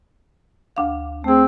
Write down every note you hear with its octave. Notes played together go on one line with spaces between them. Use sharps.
D2 D4 F5
A3 C4 G#4